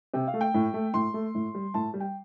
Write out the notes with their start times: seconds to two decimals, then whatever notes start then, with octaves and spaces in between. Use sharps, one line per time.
0.14 C3 G5
0.27 F5
0.34 A3
0.41 G5
0.54 A2
0.74 A3
0.94 A2 C6
1.14 A3
1.35 A2
1.54 G3
1.74 A2 A5
1.94 G3
2.00 G5